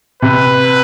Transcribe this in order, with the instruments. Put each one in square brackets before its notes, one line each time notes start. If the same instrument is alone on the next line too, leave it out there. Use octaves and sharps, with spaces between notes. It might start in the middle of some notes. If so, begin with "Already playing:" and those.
[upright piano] C3 [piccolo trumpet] B4